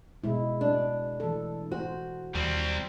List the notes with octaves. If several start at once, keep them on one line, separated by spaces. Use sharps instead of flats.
B2 G#3 E4
D4
E3 A4
F#4 C5
D#2 G3 C4